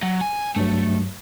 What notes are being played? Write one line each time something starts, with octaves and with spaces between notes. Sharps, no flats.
F#3
G#5
G2 F#3 A3